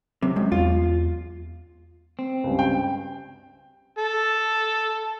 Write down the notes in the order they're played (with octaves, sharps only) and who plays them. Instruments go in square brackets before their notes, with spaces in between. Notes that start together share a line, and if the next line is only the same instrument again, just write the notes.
[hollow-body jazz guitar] C3 [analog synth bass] F#3
[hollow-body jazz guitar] F#2 [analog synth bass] G#3
[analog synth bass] E2 [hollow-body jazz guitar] F4
[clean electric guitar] C4
[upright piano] C#2 G2
[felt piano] G5
[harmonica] A4